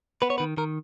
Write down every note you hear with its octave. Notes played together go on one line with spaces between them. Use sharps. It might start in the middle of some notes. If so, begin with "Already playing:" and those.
B3 B4
C#5
D#3 B4
D#3 A#4